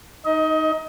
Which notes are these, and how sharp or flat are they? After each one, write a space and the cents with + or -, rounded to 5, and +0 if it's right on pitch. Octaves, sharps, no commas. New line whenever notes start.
D#4 +0 D#5 +25